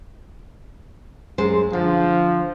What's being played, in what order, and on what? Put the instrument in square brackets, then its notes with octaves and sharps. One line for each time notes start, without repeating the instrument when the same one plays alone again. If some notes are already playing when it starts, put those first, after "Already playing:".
[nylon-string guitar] F#2 G#3 C5
[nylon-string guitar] D3 [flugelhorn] F3